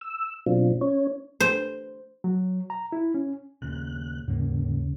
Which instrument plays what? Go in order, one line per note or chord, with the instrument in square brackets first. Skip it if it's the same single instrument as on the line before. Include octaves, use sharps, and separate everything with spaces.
[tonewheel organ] E6
B2 F#3 C4 D4 F4
C#4 C#5
[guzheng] C5
[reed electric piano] F#3
A#5
E4
C#4
[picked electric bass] D#2 A#2 C#3 [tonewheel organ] F#6
[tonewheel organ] D#2 C#3 [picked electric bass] G#2 G3 A#3